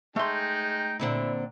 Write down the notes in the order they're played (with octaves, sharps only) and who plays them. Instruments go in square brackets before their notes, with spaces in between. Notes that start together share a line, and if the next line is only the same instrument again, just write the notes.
[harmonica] G#3 D#4 [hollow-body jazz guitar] A3 C6 [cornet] G5
[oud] A#2 D3 C4 [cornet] E4